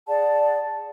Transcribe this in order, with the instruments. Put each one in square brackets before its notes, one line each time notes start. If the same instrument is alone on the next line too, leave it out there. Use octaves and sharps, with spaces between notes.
[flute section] G#4 D5 F#5 A5